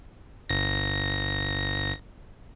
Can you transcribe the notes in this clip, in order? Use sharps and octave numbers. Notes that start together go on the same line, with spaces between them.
G1 A#6